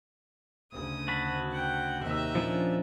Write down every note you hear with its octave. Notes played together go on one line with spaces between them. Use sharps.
D2 C#3 D#6
F#4 A5 B5
F#5 G5
D#2 C3 D#4 E5
A#2 F3 C#4 D4